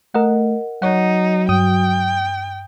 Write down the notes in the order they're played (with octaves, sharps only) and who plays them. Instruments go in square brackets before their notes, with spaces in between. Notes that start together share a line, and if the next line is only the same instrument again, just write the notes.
[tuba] A3 [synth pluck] A#4 D#5 F#5
[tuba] F#3 [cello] D#4 [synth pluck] C#5 F#5
[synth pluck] G2 D#6 [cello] G5